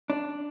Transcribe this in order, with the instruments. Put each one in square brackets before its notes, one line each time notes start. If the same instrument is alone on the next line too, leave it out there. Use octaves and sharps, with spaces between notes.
[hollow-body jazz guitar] D4